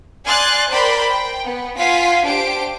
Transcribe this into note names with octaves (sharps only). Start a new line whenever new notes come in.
D5 G#5 C6 F6 F#6 A6
A#4 C5 D5 G5 B5 C6
G5
B3
F4 F5 F#5 G#5 B6
D4 G4 C5 D7